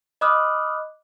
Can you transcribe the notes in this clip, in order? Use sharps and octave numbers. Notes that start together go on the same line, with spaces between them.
D#5 B5 D6 D#6 F6 F#6